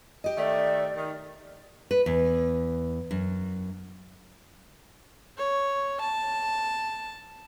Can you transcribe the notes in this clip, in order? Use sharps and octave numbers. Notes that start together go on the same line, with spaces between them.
G4 D#5
D#3 A3 D5
D#3
B4
E2
F#2
C#5
A5